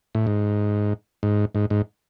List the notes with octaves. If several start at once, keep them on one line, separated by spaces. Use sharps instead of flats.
A2
G#2
G#2
G#2
G#2